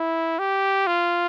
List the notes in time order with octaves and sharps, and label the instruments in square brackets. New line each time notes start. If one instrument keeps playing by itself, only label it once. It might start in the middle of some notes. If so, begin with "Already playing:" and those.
Already playing: [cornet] E4
G4
F4